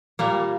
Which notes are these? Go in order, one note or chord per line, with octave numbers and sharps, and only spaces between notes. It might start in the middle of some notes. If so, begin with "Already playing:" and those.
A#2 G3 A#3